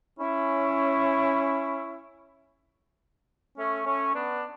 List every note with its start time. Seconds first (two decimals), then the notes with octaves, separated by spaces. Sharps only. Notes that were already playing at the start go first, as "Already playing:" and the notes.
0.20 C#4 E4
3.58 A3 C#4
3.86 A3 C#4
4.14 B3 D4